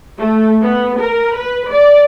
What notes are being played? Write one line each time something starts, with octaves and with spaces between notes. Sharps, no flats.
A3
B3
A#4
B4
D5